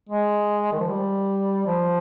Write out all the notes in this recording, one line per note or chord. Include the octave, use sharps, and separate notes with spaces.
G#3
D#3
F3
G3
F3